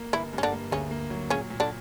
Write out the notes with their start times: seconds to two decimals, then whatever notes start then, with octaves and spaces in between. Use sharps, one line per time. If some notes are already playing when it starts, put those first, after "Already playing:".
Already playing: A#3
0.13 G1 E3 E4
0.33 G2
0.38 C#4
0.43 D3 D4
0.53 A#3
0.71 D2 C#3 C#4
0.91 A#3
1.10 F#3
1.30 A#2 C#3 C#4
1.50 A#2
1.60 D3 D4